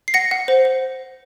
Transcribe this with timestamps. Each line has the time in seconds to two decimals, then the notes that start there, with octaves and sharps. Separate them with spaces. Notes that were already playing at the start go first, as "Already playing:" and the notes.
0.08 C7
0.14 F#5 A#6 C#7
0.31 F#5
0.48 C5
0.65 C5